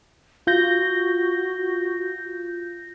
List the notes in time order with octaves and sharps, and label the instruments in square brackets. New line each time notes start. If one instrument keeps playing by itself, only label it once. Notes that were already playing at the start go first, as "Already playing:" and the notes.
[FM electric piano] F4 G6 A#6 [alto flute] F#4